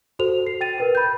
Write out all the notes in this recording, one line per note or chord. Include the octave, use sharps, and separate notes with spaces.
F#4 A4 C5 F7
C7
G5 A6 D#7
A#4 B4 G5
B5 G6